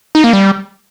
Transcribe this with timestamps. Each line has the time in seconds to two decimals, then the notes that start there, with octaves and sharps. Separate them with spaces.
0.15 D#4
0.24 A#3
0.33 G3